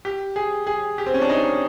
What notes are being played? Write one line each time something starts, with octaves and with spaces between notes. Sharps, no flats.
G4
G#4
G#4
G4
C4
C#4
D4
D#4